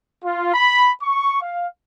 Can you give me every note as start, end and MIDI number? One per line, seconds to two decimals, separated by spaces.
0.23 0.54 65
0.54 0.93 83
1.03 1.40 85
1.42 1.68 77